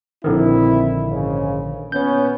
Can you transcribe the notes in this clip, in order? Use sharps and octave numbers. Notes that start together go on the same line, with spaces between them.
A#1 D3 D#3 C4 E4
G#2 C#3
A#2 B3 C#4 C#5 G6